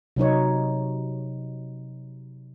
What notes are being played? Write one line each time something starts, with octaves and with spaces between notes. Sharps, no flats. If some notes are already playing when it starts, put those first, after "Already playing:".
C3 F#3 D#4 C#5